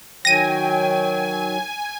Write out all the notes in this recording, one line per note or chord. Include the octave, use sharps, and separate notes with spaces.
D#3 F#3 G5 G#5 A#6 D#7